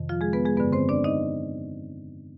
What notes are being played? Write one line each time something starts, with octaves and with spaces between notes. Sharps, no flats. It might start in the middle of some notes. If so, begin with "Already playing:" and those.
Already playing: F2 C3 D#3
F3 F4
G#3 G#4
B3 B4
G#3 G#4
G2 D3 B3 B4
C4 C5
D4 D5
D#4 D#5